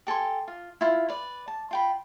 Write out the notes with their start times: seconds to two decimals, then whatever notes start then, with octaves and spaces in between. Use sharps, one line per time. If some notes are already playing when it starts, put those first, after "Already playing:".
0.07 G4 A4 G#5 C6
0.48 F4
0.81 E4 F4
1.09 B4 D5
1.48 A5
1.71 F4 G5 B5